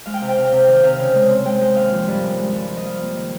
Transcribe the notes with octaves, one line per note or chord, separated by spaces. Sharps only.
G#3 F5
G5
C3 F5
G5
C3 F5
G5
C3 F5
G5
D#3 F5
G5
C3 F5
C#3 F5
G#3
C4
G#3 G5
G#3 G5
D#2 F5
F3
G2
G#3
G#3
G2
F3
D#5
G3 F5
A#3
D#3